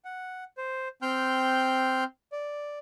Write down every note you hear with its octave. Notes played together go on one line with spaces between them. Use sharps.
F#5
C5
C4 G5 C6 F6 G6
D5